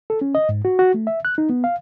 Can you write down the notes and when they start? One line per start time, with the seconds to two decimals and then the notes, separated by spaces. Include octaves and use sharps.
0.10 A4
0.21 C#4
0.35 D#5
0.49 G#2
0.65 F#4
0.79 F#4
0.94 A3
1.07 E5
1.25 F#6
1.38 D#4
1.50 B3
1.64 F5